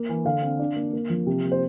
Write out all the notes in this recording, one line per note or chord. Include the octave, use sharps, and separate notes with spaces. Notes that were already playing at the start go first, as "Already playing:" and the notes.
Already playing: A#3
E3
D3 F5
C4
D4
A#3
A#3
F3
C3
A#3
C5